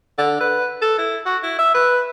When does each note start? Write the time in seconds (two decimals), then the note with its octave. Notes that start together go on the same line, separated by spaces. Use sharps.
0.18 D3
0.41 B4
0.82 A4
0.98 E4
1.26 F#4
1.43 E4
1.59 E5
1.74 B4